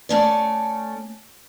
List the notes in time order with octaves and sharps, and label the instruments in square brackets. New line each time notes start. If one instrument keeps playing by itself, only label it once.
[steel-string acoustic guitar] A3 C#4 D5